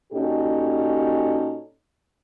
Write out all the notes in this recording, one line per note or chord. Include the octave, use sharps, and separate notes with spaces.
A#2 C#4 D#4 F#4 G4 A4